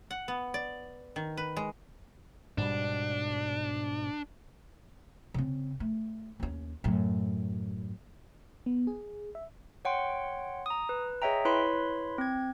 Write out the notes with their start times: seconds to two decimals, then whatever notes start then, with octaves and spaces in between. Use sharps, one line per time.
0.11 F#5
0.28 B3
0.54 D5
1.16 D#3
1.37 B4
1.56 G#3
2.58 G#2 B2 G3 D4
5.34 C#3 C4
5.80 A3
6.40 D#2 C#4
6.84 F#2 A2
8.66 B3
8.87 G#4
9.35 E5
9.85 C#5 F#5 G5 C6
10.66 A#5 D#6
10.89 B4
11.22 G#4 C#5 D#5 E5 G5 A#5
11.45 E4 B4 C#5 B5 C6 B6
12.18 C4 G#6